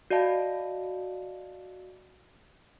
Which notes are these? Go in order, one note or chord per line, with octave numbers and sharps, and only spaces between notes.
F#4 D5 D#5 F5 A5